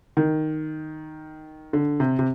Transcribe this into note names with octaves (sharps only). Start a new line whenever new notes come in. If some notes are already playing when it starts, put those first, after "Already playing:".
D#3
D3
C3
C3